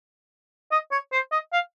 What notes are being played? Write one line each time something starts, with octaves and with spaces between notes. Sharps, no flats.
D#5
C#5
C5
D#5
F5